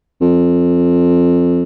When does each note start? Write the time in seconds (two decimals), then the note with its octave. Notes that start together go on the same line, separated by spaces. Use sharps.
0.21 F2